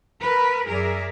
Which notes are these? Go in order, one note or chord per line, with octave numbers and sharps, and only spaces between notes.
A#4 B4
F#2 G#4 A#4 D5 E5